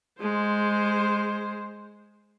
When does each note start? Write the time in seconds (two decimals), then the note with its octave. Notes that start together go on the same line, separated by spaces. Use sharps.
0.20 G#3 C5